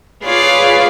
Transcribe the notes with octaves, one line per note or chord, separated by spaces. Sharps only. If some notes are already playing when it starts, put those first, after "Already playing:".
F4 G#4 B4 C#5 D5 F5